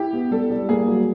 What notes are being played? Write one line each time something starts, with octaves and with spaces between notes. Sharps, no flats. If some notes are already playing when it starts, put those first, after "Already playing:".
Already playing: E4 G4
B3
G3 A4
G3
A#3 G#4
F#3